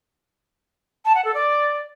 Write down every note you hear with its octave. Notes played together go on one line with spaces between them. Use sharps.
A5
F#5
A4
D5